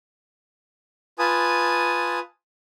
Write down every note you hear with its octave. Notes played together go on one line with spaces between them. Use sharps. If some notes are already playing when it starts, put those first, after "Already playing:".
F4 B4 G#5 A5 D#6